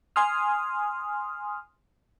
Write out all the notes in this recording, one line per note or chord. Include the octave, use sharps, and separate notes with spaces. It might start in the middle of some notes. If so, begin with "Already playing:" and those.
G#5 C6 D#6 F6